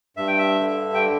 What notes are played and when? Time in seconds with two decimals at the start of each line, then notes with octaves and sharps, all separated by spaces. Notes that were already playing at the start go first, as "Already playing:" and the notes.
0.17 G2 E5
0.28 G5
0.38 E5
0.60 D3
0.94 G5